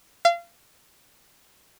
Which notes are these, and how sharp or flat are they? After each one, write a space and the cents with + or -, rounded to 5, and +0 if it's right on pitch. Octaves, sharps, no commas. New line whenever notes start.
F5 -30